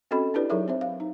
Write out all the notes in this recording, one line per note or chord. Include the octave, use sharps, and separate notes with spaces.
C4 C#4 F#4 A4 D#5 B5
D4 E4 G4 B4 D5
F#3 D#4 E4 G#4 A#4 E5
C4 C5 E5
F5
D#4